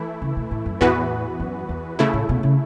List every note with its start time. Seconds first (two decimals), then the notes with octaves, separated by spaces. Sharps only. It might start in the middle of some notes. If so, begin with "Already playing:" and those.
Already playing: E3 A3 E4
0.22 C#3
0.37 B2
0.51 A2
0.66 F#2
0.81 E2 A2 E3 B3 F#4 B4
1.40 F#2
1.69 E2
1.99 C#3 A3 E4
2.13 A2
2.29 B2
2.43 C#3